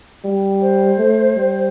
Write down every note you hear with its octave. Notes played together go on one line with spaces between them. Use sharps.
G3
C5
A3
G3